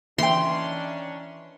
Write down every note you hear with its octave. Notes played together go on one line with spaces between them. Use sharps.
D#3 E3 C#4 D4 E5 G5 C6